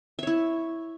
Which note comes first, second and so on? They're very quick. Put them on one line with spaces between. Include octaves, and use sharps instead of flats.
E5 C#5 E4